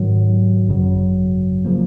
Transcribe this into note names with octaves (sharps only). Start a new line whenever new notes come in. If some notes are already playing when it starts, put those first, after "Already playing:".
Already playing: G#2 D#3 F#3
G#1 F#2 C#3 F#3
C#3 F3 A#3